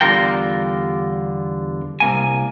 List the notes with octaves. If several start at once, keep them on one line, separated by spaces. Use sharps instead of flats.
E2 D3 G3 F4 A#4 G5
C2 A#3 G#5